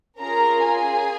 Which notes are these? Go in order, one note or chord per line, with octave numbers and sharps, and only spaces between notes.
C#4 F4 G#4 A#4 A#5
G#4 G#5